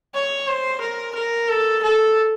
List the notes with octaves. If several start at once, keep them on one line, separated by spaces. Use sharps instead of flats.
C#5
C5
A#4
A#4
A4
A4